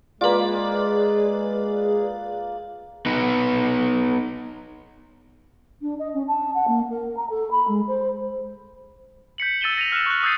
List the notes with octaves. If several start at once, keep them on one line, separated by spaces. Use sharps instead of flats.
G#3 A#3 F4 G#4 B4 D5
B3 D#4 B4
D4
D#5
C#4
A5
F#5
A#3
A#4
A#5
A4
B5
G#3
C5
G6 B6 C#7 F#7
E6 A6 D#7 E7 G7
A#6 D#7 F7
F6 F#6 E7
C#6 F#6
D#6 E6 G6 A6 C7 D#7